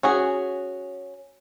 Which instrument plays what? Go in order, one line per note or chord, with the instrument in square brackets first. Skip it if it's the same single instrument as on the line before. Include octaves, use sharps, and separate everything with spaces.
[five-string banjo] C#4 F#4 G#4